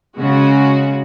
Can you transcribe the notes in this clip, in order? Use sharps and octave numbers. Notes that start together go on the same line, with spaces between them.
C#3 G#3 C#4 F#4